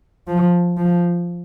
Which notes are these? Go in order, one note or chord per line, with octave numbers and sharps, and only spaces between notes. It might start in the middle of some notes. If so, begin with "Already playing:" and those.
F3
F3